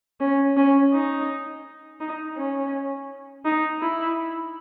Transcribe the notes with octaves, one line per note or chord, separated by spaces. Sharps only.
C#4
C#4
D#4
D#4
C#4
D#4
E4